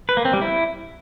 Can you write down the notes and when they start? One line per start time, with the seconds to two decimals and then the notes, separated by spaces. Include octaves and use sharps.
0.09 B4
0.17 A#3
0.25 C4
0.33 G3
0.41 E4